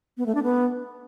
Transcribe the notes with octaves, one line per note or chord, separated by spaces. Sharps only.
B3
A3
D4
B3